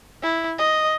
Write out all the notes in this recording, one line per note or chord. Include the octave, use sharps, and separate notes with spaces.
E4
D#5